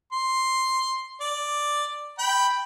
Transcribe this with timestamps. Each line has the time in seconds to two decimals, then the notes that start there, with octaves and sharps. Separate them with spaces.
0.12 C6
1.21 D5
2.19 G5 B5